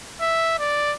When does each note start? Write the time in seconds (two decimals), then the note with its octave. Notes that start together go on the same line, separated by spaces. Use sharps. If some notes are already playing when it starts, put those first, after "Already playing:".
0.21 E5
0.59 D5